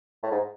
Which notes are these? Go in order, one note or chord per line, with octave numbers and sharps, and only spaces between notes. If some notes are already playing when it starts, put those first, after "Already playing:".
A2
G#2